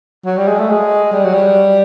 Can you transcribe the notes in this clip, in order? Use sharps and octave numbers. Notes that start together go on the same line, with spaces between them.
F#3
G3
G#3
A3
G#3
G3
F#3
G3